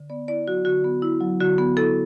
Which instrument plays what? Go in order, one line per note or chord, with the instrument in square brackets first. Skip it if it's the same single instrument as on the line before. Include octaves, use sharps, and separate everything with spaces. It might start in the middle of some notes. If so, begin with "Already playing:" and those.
Already playing: [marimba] D3
B3 D5
E4 D5
F#3 F#4
D3 F#4
B3
E4
F#3
D3 F#4
B3
E4 A4